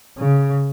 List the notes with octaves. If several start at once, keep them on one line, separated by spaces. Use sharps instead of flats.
C#3